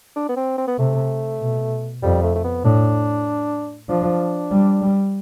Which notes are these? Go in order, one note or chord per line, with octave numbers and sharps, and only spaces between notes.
D4
B3
C4
C4
B3
C3 A3
B2
F2 G3
A3
A3
B3
A2 D4
F3 D4
G3
G3